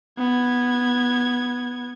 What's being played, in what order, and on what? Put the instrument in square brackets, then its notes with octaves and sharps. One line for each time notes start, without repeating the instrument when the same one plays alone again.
[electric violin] B3 G#6